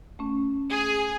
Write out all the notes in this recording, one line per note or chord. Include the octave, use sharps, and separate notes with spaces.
A3 C#4
G#4